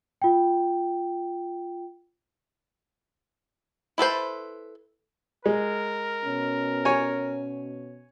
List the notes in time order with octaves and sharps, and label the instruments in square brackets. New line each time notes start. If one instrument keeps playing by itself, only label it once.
[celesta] F4 G5
[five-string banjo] E4 A4 B4 C5
[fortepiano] G#3 [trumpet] A#4
[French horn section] B2 C#4
[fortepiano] C#5 G#5